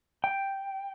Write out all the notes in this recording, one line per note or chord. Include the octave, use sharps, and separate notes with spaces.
G5